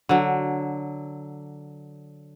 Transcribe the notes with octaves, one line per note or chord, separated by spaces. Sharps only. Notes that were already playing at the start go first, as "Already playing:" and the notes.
D3 F#3